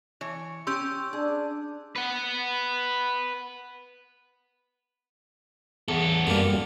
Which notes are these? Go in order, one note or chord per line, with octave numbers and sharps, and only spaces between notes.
E3 C#5
C#4 G4 C6 E6 G6
D4 G#4
B4 F#5
E2 B3 A4
F#2 D3 G3 A#3